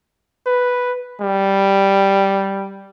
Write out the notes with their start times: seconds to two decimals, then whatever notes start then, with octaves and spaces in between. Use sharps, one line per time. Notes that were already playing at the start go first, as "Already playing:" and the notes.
0.46 B4
1.21 G3